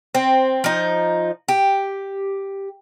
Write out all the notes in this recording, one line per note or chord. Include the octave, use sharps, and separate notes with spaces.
C4
F3 D#4
G4